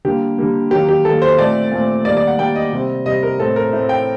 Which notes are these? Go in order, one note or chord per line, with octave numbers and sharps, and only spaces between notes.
D3 G3 A#3 G4
D3 G3 A#3
D#3 F#3 A#3 G4
G4
D#3 F#3 A#3 A4
C5
A#2 A3 C4 D5
A#2 A3 C4
D#3 G3 A#3 D5
D5
F#5
D#3 G3 A#3 G5
D#5
C3 G3 C4
C3 G3 C4 D#5
A#4
A2 A3 C4 A4
A#4
A2 A3 C4
G5